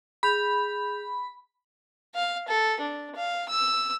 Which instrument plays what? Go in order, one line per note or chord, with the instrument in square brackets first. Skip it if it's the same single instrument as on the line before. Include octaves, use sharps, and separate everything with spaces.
[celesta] G#4 G6 F7 [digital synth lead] B5
[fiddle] F5
A4
D4
F5
E6